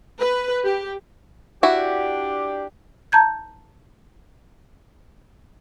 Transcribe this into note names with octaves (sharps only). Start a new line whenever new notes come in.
B4
G4
D4 E4 F#4 G4
A5 A#5 G6 G#6